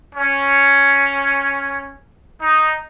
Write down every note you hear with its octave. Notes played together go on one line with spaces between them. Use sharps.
C#4
D#4